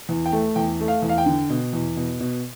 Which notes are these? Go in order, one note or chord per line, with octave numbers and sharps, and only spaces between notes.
E2
G5
A3
E2 G5
A3
F5
E2
F5
G5
D3
B2
E2
B2
B2